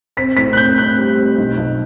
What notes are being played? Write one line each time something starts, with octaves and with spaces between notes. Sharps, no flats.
C4 B6
A2 B6
F#6
C4 G6
C4 F#6
G3
C4
B1
B1